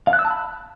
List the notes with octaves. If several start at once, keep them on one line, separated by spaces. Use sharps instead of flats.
F5
F#6
E6
A5
B5